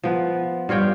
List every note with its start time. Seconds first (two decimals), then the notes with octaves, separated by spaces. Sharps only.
0.03 F3 B3
0.69 G2 F4 C#5 G5